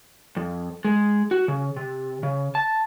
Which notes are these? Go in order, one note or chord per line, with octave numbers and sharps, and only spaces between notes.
F2
G#3
F#4
C#3
C3
C#3
A5